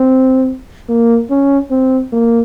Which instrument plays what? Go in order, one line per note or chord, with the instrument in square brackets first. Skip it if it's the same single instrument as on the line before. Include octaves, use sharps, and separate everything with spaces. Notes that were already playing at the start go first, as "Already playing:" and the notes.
Already playing: [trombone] C4
A#3
C#4
C4
A#3